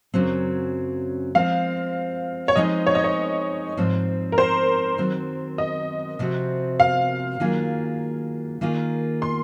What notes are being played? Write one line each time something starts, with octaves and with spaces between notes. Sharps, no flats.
F#2 C#3 F#3 C4
F3 G#3 C4 F5
C#5
F3 G#3 C4 D#4 G#4 D#5
C#5
D#5
C#5
G#2 F3 C4
A#4
C5
D#3 F#3 C4
D#5
C3 F3 C4 F#4
F5
D#3 F#3 A#3 F4 G#4
D#3 A#3 F4 G#4
C6